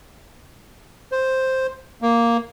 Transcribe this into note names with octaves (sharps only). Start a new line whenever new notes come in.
C5
A#3